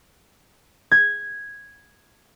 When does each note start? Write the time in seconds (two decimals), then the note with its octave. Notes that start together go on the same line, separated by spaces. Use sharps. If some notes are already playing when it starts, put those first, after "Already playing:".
0.92 G#6